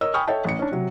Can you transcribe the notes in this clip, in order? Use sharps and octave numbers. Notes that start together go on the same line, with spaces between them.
A#4 C#5 D#5 E6
G5 G#5 B5 C#6 D#6 F6
A4 C#5 D#5 E5 G5 A5
A1 C#7
C#4 D4
C3 F#3